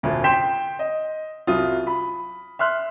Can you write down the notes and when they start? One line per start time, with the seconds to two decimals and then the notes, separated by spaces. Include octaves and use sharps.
0.03 F1 D2 A#2
0.24 G5 C6 G6 B6 E7
0.79 D#5
1.47 C2 F#3 F4 D#6
1.87 B5
2.59 E5 C6 F6 F#6